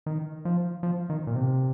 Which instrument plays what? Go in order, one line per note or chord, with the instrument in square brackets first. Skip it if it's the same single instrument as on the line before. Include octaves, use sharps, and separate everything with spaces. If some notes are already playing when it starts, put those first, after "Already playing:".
[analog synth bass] D#3
F3
F3
D#3
A#2
C3